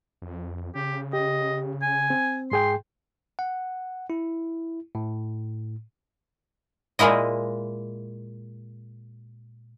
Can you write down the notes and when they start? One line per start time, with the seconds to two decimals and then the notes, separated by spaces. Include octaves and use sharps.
0.22 F2
0.75 C#3 G4
1.13 G4 D#5
1.82 G#5
2.10 C4
2.51 G#2 G#4 G5 C6
3.39 F#5
4.10 E4
4.95 A2
6.99 A#2 G#3 A#3 E4 D#5